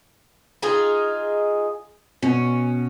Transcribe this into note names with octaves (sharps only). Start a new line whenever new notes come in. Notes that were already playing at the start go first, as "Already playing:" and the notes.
D#4 F4 G#4
B2 C#4